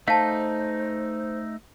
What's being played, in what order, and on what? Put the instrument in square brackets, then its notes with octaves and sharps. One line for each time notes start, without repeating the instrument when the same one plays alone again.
[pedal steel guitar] A3 D#4 [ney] C5 [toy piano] F5 A5